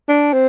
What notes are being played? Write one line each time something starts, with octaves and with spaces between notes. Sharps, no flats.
D4
C4